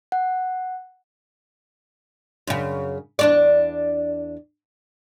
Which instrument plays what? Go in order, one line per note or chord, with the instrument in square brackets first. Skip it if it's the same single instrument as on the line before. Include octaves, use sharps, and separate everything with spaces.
[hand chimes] F#5
[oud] F#2 C#3
E2 D4 D5